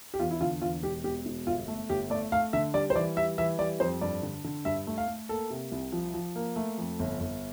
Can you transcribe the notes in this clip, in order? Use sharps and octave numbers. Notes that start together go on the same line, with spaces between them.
G4
E2 F4
E4
D3 F4
E2 F4
E1 G4
E1 G4
E1
G1 F4
A3
G1 G4
A3 D5
A3 F5
D3 E5
G3 D5
C5
E3 D5
G3 E5
E3 E5
G3 D5
F2 C5
G2 D5
D3
D3
G2 E5
A3
F5
A3
A#3 A4
C3
C2
F3
F3
A#3
A3
F2
G1
G1